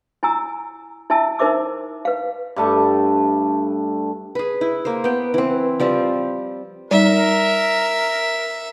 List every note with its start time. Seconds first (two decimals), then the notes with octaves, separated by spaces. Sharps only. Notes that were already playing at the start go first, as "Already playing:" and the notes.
0.23 E4 G#5 A#5 E6
1.10 E4 E5 G#5 A5 E6
1.39 D#4 A#4 C5 E5 D6 E6
2.05 B4 F5
2.56 G2 A3 A5
4.35 G#4 B4
4.61 E4
4.85 A#3 C5
5.04 B3 G5
5.34 E3 C4
5.80 F3 G3 C4
6.91 G3 D#4 A#4 E5